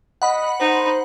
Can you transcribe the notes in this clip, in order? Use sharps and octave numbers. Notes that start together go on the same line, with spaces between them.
D#5 F#5 B5
D#4 C5